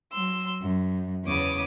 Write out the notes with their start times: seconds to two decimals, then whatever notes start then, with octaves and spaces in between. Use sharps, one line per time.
0.11 F#3 C6 E6
0.61 F#2
1.24 E2 C#3 B3 C#5 D6 D#6